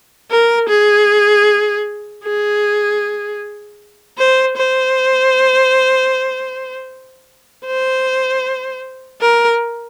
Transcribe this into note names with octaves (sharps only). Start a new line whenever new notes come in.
A#4
G#4
G#4
C5
C5
C5
A#4